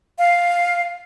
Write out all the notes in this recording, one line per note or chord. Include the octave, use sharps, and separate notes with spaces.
F5